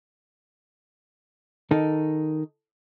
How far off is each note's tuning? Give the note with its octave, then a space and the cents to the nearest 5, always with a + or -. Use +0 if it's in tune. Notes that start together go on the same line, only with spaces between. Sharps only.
D#3 +0 D#4 +0 A4 +0